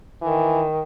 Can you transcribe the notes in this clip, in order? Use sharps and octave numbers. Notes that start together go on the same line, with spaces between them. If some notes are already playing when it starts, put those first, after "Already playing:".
D#3 E3